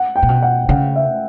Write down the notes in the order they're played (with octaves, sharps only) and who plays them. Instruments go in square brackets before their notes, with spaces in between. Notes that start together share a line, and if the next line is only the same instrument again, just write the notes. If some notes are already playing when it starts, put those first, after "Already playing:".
Already playing: [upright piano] F#5
G5
[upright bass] A#2
B2
[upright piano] F#5
[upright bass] C#3 [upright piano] F#5
[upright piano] E5